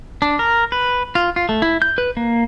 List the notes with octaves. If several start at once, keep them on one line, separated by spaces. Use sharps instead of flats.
D4
A#4
B4
F4
F4
A3
E4
G6
B4
A#3